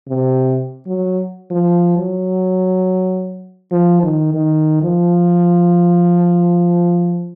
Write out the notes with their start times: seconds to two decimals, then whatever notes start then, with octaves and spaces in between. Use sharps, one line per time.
0.08 C3
0.87 F#3
1.51 F3
1.97 F#3
3.72 F3
4.03 D#3
4.34 D#3
4.82 F3